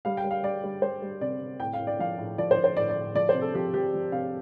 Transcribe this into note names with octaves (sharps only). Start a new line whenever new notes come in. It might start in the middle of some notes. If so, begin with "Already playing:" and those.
G3 F5
G5
G3
F5
G3 D5
G3
G3 C5
G3
C3 D5
C3
A2 G5
F5
A2
D5
F3 F5
A2
F3 D5
C5
F3
C5
A2 D5
D5
A2
F3 D5
C5
C3
A4
F3 G4
F3 G4
F3
C3 F5